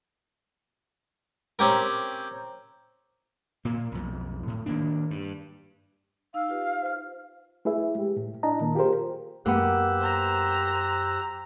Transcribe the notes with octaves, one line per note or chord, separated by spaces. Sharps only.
C4 C#4 G4 A#4
A#2 A#3
B1 F2
A2
D#3 A#3 D4
G2
D#4 F5 E6
F4 G4 B4
C5 F6
A3 E4 G#4 B4 E5
G#3 G4
A2
D4 E4 D#5 A5 A#5
A#2 D#3 A#3
F4 G4 G#4 A#4 C5
F#2 A#3 B3 G4 E6 F#6
C5 A#5